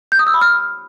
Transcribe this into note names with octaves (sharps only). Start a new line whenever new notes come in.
G6
D#6
E6
B5
F6